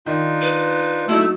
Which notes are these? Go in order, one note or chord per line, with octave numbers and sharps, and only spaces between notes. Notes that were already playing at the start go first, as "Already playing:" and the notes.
D#3 D4 D#4 F4
B4
F#3 A3 D#4 E4 E6